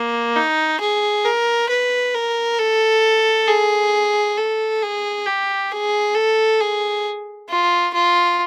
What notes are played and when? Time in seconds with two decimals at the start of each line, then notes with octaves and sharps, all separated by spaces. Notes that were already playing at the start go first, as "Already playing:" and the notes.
Already playing: A#3
0.36 D#4
0.80 G#4
1.25 A#4
1.69 B4
2.14 A#4
2.59 A4
3.47 G#4
4.37 A4
4.82 G#4
5.26 G4
5.71 G#4
6.15 A4
6.60 G#4
7.49 F4
7.94 F4